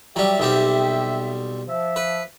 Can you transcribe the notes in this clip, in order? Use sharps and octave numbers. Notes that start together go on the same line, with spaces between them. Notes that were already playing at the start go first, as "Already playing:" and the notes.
F#3 G3 G4 E5
B1 G3 C4
F3 E5
B4